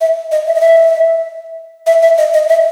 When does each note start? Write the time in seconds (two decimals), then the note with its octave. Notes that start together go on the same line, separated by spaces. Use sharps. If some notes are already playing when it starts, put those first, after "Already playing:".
0.01 E5
0.32 D#5
0.47 E5
0.55 D#5
0.61 E5
1.87 E5
2.03 E5
2.18 D#5
2.34 D#5
2.49 E5